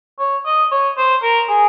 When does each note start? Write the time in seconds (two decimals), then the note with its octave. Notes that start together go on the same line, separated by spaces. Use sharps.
0.19 C#5
0.46 D#5
0.72 C#5
0.98 C5
1.23 A#4
1.50 G#4